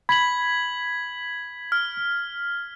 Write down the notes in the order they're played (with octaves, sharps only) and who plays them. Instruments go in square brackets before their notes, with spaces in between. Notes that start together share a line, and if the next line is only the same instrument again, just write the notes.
[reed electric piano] B5 [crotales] G#6 B6 F#7
[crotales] F6